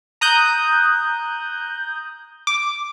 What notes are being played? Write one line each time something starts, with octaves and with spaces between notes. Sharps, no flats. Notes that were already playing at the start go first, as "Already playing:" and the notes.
A#5 D#6 F#6 G6
D6